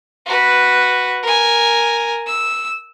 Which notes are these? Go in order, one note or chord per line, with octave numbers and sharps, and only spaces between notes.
F#4 B4
A#4 G#5
E6